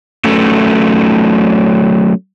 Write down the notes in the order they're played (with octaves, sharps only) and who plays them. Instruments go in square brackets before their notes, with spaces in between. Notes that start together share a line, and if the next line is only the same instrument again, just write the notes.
[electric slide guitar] F#3 A3 C#4 A4